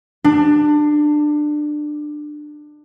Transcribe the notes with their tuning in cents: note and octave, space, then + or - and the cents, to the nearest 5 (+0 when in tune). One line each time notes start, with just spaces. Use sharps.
D4 +20 G4 +0